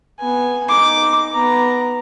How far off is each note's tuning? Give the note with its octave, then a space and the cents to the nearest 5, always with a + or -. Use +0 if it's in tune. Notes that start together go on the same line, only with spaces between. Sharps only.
B3 -5 G#5 +0
D#4 +0 D6 +0
B3 +0 A#5 +0